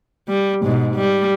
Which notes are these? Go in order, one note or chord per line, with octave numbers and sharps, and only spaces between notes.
G3
G#2 B2
G3